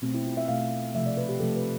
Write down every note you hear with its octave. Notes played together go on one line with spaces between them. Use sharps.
B2 A3 C4
E4
F4
E5
B2 A3 F5
C3 F3 A3 E5
D5
B4
G4
C3 F3 A3 A4
B4